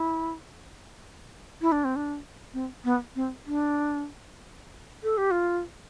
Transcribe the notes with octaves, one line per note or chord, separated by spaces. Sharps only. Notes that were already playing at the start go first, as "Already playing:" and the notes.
Already playing: E4
E4
D4
C4
D4
C4
B3
C4
D4
A4
G4
F4